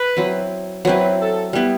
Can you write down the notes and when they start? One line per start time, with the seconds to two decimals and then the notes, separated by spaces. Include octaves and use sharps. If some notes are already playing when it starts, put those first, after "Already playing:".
Already playing: B4
0.17 F#3 C4 E4
0.85 F#3 C4 E4 B4
1.20 A4
1.53 G3 B3 E4